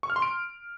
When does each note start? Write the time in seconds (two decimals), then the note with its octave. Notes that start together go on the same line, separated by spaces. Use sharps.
0.03 C#6
0.10 F6
0.16 C6
0.22 D7